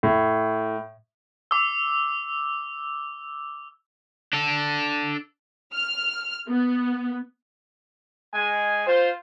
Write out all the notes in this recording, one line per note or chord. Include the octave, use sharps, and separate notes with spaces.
A2
D6 E6
D4 A4
F6
B3
G#3 G#5
F4 C5